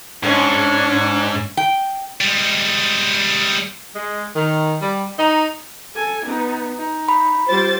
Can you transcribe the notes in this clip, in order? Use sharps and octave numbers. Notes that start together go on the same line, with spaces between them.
G#2 C#4 D4
G5
G3 G#3
G#3
D#3
G3
D#4
A4 G#5
B3 D#4
D#4
B5
G3 F4 C5 A6